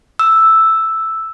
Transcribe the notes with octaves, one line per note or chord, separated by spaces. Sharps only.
E6